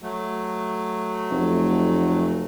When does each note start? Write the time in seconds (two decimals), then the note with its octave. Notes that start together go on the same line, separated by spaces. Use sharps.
0.02 F#3 A3
1.31 F1